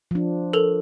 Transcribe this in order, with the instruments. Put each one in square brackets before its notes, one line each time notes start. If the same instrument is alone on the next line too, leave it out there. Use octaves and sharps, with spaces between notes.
[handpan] F3 D4
[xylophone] A4 A#4 F7